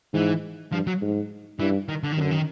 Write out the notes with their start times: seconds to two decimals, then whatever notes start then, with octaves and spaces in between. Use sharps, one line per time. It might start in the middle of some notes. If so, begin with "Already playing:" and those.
0.14 G#2 E3
0.72 G2 F3
0.87 F#3
1.02 G#2
1.59 G2 E3
1.89 D#3
2.03 D3
2.13 D#3
2.17 F#2 D3
2.31 D#3